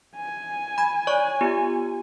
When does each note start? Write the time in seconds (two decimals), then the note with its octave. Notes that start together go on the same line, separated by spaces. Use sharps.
0.16 G#5
0.78 B5 G#6
1.07 C#5 D5 C#6
1.41 B3 F4 G4